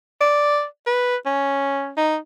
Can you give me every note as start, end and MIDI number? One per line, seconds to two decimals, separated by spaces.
0.20 0.64 74
0.86 1.16 71
1.26 1.92 61
1.97 2.16 63